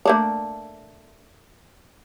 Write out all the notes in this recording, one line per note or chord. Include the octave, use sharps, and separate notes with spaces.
A3 A#3 D4